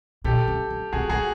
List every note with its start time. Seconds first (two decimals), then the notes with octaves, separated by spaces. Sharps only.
0.24 B2 G4 A4
0.48 C#3
0.70 C#3
0.93 C3 F#4 G#4
1.10 C3 F#4 G#4